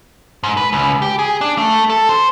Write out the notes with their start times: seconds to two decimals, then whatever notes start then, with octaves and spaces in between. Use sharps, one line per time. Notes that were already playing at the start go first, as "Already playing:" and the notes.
0.44 G#2
0.57 B4
0.73 C#2
1.02 G4
1.19 G#4
1.41 D4
1.58 A3
1.90 A4
2.09 C5